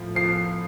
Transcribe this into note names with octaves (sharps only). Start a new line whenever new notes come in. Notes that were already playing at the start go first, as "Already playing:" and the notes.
Already playing: A2 F3
F3 C7